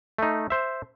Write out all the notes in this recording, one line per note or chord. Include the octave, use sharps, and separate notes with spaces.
A3 D#4
C5 E5